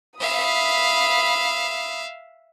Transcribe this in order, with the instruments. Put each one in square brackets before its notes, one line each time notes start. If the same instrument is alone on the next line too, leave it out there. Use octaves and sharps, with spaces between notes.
[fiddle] E5 F5 [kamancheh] B5 D#6